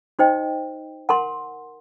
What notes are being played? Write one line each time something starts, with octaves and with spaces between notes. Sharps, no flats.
D#4 F#4 C5 D#5 G5
A#4 F#5 A5 C6